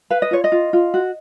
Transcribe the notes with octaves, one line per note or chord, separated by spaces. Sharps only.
B4 F5
D#5
F4 C#5
D#5
F4
F4
F#4